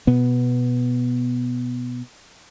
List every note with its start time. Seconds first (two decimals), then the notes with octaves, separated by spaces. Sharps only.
0.07 B2 B3